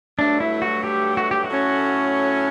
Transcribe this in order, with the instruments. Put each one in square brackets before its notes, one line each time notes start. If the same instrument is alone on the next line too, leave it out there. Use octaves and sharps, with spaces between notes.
[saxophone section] G2 F#3 A3 [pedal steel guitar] D4
[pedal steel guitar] E4
F#4
G4
F#4
G4
F#4
[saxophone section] A2 F#3 A3 C#4